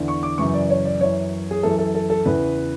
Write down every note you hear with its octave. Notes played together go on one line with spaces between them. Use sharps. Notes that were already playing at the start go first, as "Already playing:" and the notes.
Already playing: E2 D3
C#6
D6
F#2 C#3 E3 C#6
D5
C#5
D5
F#2 E3 C#5
G#4
F#2 E3 A4
A4
A4
A4
E2 C#3 E3 B4